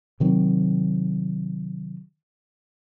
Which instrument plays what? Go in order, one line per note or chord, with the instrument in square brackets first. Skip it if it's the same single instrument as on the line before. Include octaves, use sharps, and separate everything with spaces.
[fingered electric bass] C3 D#3 F#3 C4